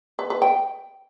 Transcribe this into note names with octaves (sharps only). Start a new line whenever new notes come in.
B4
B4
G5